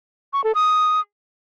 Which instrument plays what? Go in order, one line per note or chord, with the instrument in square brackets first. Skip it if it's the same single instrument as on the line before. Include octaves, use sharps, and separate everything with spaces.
[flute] C#6
A4
D#6